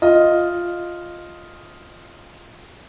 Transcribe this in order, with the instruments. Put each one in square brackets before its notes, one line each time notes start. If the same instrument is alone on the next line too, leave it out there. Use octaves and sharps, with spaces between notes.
[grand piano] F4 D#5